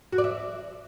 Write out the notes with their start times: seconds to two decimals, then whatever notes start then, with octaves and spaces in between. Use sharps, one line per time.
0.12 F#4
0.18 D5
0.24 E5